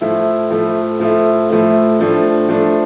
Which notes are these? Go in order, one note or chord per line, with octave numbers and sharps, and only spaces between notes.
A2 F3 A3 E4
A2 F3 A3 E4
A2 F3 A3 E4
A2 F3 A3 E4
A2 F3 A3 D4
A2 F3 A3 D4